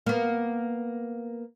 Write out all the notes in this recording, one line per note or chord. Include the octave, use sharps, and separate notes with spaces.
A#3 B3